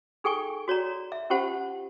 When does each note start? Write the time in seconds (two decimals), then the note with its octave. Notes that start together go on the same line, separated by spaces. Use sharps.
0.24 D#4 G#4 A4 G5 G#5 C#6
0.68 F#4 C#5 D5 A#5
1.12 E5
1.30 C#4 F4 G4 C5 F#5 A5